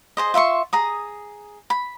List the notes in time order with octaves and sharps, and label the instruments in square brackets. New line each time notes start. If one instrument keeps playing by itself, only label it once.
[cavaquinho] G#4 C5 D#5
F4 E5 C6 C#6
G#4 A#5 D#6
B5